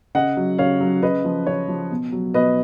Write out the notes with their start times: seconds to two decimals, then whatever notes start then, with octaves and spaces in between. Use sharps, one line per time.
0.15 C#3 D#5 F#5
0.37 F#3
0.58 C#3 C#5 F5
0.81 F#3
1.02 C#3 B4 D#5
1.25 F3
1.47 C#3 C#5
1.68 F3
1.91 B2
2.12 F#3
2.34 B2 B4 D#5